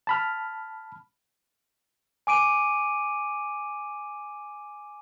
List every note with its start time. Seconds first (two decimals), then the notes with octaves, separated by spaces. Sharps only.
0.07 A5 B5 F6
2.27 G#5 D6 D7 D#7